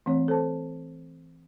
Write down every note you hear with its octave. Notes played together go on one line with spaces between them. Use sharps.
E3 A3 C4 C#5
A4 C5 A5